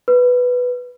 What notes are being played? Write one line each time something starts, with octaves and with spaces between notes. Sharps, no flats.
B4